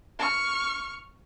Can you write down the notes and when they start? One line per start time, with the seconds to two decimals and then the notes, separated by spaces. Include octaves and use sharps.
0.19 C#6 F6